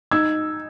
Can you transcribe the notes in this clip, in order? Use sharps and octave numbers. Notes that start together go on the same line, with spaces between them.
D#4 E6 G#6